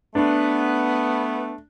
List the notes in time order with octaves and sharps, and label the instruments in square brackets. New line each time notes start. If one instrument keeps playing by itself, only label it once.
[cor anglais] A3 [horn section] B3 [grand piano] D4